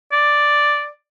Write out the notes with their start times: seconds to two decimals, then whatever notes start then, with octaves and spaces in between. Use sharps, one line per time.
0.12 D5